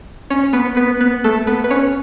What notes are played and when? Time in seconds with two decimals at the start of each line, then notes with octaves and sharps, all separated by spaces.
0.30 C#4 C#5
0.53 B3 B4
0.77 B3 B4
1.00 B3 B4
1.24 A3 A4
1.47 B3 B4
1.64 B4
1.71 C#4 C#5